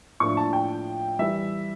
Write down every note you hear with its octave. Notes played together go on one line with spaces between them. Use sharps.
A2 F3 A#3 D4 C#6
A5
G5
E3 G3 E5